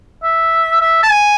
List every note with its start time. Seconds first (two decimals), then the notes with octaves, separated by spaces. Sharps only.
0.23 E5
0.81 E5
1.03 A5
1.11 G#5